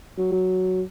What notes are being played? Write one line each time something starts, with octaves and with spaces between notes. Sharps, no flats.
F#3
F#3